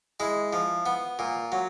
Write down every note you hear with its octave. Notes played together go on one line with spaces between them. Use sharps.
G#3 E4
F3
B3
A#2
F#3